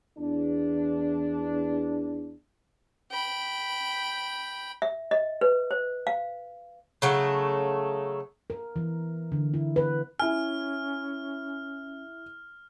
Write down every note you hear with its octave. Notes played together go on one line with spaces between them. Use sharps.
E2 D4
G5 B5
E5
D#5
B4
C5
F5
C#3 F#3 A3
A#4
E3
D3
E4
B4
C#4 E4 G#5 F6